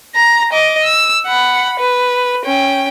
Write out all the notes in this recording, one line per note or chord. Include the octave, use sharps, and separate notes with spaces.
A#5 A#6
D#5 D6
E6
F#5 B5
B4
C#4 G5